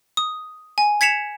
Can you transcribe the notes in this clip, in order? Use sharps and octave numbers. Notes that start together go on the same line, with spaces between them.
D#6
G#5
G#6 B6 C#7 E7 F7